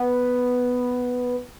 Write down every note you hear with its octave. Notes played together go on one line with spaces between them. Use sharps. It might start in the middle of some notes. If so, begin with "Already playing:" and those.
Already playing: B3